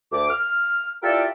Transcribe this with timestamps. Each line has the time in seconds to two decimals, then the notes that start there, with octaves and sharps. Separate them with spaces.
0.11 D2 D6
0.29 F6
1.03 E4 F4 G4 A4 A#4 D5